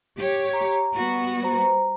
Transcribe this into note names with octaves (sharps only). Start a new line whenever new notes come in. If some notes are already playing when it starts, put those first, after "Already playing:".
G4 C#5
A#5
G3 B3 F#4
C5 A#5